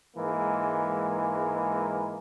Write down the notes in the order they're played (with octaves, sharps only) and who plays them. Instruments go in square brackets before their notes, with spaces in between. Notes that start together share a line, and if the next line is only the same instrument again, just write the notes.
[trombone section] G#2 E3 G#3 A#3